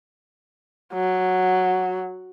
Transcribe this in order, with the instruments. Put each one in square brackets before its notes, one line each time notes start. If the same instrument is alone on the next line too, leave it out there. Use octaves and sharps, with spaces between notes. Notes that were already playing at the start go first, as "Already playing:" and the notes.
[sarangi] F#3